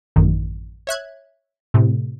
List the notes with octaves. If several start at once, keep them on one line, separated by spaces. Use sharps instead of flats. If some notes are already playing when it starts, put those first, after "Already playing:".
A1 F#2 D#3
C#5 E5 F#6 G#6
A2 C3